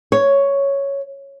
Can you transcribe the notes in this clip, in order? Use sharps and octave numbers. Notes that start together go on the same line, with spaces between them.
C#5